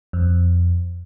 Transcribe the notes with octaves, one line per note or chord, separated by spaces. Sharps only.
F2